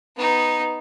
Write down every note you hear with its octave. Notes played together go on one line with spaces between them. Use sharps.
B3 D#4